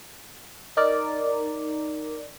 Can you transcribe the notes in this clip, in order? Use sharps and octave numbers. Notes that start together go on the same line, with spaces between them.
D#4 A#4 D5